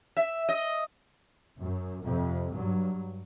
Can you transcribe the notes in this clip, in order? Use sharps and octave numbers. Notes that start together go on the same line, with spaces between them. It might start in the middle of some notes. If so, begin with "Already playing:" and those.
E5
D#5
F#2
F2 C3
G2 F#3